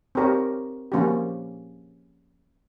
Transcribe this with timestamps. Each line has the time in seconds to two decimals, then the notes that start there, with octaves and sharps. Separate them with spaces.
0.15 C4 G4 A#4 C#5
0.92 F3 A#3 C#4 G4